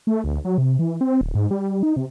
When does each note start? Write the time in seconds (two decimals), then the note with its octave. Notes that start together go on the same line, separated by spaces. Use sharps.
0.07 A3
0.24 D2
0.45 F#3
0.58 C3
0.79 E3
1.01 C4
1.21 D1
1.35 G#2
1.51 G3
1.83 D#4
1.96 C3